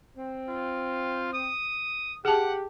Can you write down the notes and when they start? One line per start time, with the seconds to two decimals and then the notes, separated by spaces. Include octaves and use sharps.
0.16 C4
0.48 F4
1.33 D#6
2.25 G4 G#4 F#5 A5